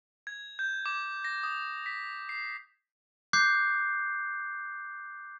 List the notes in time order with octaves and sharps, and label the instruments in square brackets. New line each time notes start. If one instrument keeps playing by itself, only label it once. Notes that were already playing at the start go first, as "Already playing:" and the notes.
[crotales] G#6
G6
D6
A#6
D#6
B6
C7
[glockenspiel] D6 F#6 G6 C7